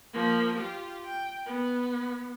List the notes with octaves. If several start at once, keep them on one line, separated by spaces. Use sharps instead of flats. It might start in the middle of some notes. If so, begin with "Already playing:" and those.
F3 A#3
F4 G4
G5
B3